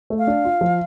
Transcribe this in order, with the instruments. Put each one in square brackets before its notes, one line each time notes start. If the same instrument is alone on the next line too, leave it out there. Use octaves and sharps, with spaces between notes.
[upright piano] A3
[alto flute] F5
[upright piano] D4
F4
F3